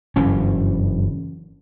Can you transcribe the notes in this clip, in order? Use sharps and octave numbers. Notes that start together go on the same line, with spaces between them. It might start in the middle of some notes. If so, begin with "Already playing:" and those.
F#1 G2 E3 C#4